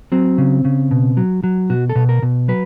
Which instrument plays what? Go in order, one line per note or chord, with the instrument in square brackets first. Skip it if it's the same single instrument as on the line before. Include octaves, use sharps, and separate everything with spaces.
[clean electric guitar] F#3 C4
C#3
C#3
B2
F#3
F#3
B2 F#4
A4
B2
A#4
B2
F#3 B4